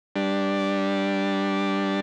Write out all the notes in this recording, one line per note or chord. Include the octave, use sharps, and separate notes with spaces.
G3 D4